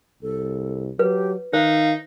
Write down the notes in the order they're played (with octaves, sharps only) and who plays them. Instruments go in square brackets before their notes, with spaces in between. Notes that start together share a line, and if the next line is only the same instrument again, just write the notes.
[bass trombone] C2 [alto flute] A4
[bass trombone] F#3 [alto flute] G4 [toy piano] B4
[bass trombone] D#3 [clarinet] D#4 [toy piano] C5 [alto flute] F5